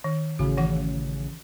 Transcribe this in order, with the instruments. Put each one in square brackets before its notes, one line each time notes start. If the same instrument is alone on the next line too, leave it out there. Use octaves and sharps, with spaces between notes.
[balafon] D#3
[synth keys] A1 C#3 [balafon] F#4
[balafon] D#3 E3 F#5